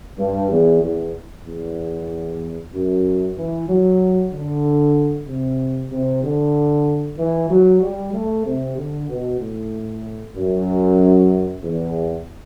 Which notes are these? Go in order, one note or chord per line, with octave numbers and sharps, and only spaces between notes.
G2
E2
E2
E2
F#2
E3
F#3
D3
C3
C3
D3
E3
F#3
G3
A3
C3
D3
B2
A2
F#2
E2